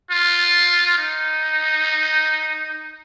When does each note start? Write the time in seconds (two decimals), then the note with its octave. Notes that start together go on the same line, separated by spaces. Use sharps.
0.11 F4
0.98 D#4